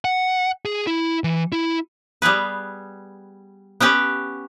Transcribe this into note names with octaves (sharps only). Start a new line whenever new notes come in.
F#5
G#4
E4
E3
E4
G3 B3 G#4 B4
B3 C#4 G4 B4